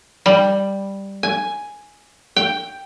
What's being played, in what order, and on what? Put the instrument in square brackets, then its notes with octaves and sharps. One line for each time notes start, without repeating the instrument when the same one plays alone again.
[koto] G3
G#5
G5